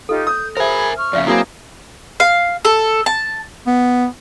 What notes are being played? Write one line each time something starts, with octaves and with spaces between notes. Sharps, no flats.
D#4 F4 G4 A4
D#6 G6
G#4 A#4 C5 E5 G#5 B5
C#6 F6
F2 C#3 D5 E5 F5
F#3 A#3 C4 E4 G#4 G#5 B5 D#6
F5
A4
A5
B3